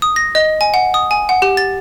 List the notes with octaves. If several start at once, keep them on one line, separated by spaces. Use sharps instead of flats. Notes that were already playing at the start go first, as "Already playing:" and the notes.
D#6
A#6
D#5
G#5
F#5
D#6
G#5
F#5
G4
A6